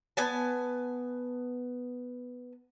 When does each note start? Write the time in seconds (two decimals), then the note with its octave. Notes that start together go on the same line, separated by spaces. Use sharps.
0.17 B3 G#5 A5